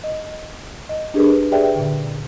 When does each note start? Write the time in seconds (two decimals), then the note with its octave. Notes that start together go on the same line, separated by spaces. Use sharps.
0.04 D#5
0.89 D#5
1.14 D4 G4 G#4 A#4 B4
1.52 G4 G#4 B4 D5 E5 G5
1.75 A#2 D3